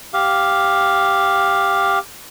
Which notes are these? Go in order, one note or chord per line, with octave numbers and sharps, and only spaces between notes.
G4 F5